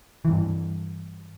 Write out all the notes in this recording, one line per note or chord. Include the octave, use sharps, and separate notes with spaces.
G2 E3